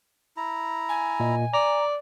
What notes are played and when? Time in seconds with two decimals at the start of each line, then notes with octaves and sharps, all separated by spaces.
0.37 E4 A#5
0.88 G#5
1.20 A#2 D#5
1.54 D5 A#5